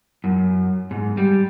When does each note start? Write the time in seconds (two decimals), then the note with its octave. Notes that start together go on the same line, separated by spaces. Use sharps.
0.24 F#2
0.91 G#2
1.17 G3